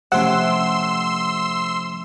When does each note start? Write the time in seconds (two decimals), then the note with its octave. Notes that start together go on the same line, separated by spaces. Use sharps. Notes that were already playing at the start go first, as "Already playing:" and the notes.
0.12 C3 F3 A3 C#4 F#5 C6 E6